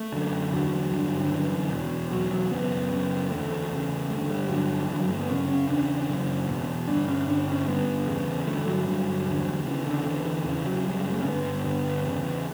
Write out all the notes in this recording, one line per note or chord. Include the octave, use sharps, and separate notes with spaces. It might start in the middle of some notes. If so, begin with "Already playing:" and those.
Already playing: A3
F#2 D3
E2 D3 F#3
G2 D3
D3
F#2 D3 E3
E2 B2
E2 B2 F#3
F#3
F#2 C#3 B3
F#2 C#3
E2 D3 A3
E2 C#3
G2 D3 A3
G3
G2 D3 F#3
G2 D3 E3
F#3
A3
B3
F#2 C#3 C#4
C#4
E2 C#3 D4
F#2 C#3
E2 B2
G2 D3 D4
C#4
G2 D3 D4
C#4
G2 D3 B3
E2 C#3
G2 D3 A3
F#3
G2 D3 F#3
E2 D3
E2 C#3 E3
D3
E2 D3 E3
E3
E2 C#3 E3
F#3
F#2 C#3 G3
G3
A3
C#4
G2 D3 B3
G2 D3 B3
E2 C#3